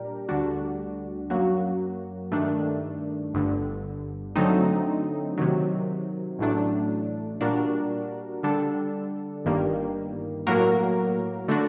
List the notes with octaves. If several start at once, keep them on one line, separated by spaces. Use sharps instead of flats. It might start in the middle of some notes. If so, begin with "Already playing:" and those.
Already playing: A#2 G3 D4 G4 A#4
D2 D3 G3 D4 F#4
F#2 F#3 A#3 F#4
G2 D#3 A3 D4
G1 G2 D3
D3 F#3 A3 C4 D#4
C3 D#3 F#3
A1 A2 F#3 A3 D4
A#2 G3 D4 F#4 A#4
D3 G3 D4 A4
G1 G2 D#3 G3 A#3
A2 F#3 A#3 F#4 A#4
D3 A3 D4 F#4